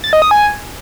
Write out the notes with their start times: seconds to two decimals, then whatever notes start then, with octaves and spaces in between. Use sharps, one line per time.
0.04 A6
0.13 D#5
0.22 D#6
0.31 G#5